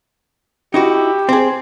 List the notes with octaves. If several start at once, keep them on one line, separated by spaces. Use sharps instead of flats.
D#4 E4 F#4 G4
C4 G#4